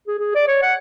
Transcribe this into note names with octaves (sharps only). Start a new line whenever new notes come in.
G#4
G#4
D5
C#5
F#5